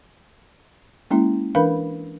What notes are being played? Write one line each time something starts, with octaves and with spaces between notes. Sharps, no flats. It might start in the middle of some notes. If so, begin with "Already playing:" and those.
G#3 A#3 C#4 E4
E3 D4 A#4 B4 F5 B5